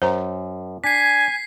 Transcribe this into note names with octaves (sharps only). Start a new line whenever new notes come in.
F#2 C5 A#5
D4 G#5 B6 C7